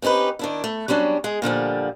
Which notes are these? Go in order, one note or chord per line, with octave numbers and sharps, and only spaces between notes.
C4 C#4 D#4 G4 B4
D#3 D4 E4
A3
F#3 G3 C#4 D4
G#3 G#4
A#2 D3 F3 G3